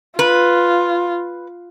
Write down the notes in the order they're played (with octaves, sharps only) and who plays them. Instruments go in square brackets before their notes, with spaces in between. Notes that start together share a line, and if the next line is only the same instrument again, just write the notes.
[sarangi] F4 [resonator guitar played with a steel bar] B4